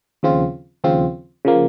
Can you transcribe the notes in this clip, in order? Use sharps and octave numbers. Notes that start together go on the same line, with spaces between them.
D#2 C#3 F3 C4 F4
D#2 C#3 F3 C4 F4
C#3 F3 A#3